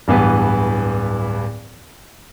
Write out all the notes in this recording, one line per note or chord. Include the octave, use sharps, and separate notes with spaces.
D1 G2 E3 B3